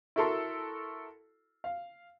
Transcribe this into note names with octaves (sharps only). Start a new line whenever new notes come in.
E4 F#4 A4 A#4 A5 C6
F5